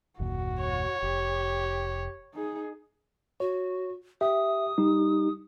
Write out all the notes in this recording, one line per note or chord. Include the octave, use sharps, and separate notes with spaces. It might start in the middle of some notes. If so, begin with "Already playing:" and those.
F#1 D#2 A#2 F#4
C#5
F1 G4
D#4 G#4
F#4 C#5
G4 E5 D#6
G3 D#4 G4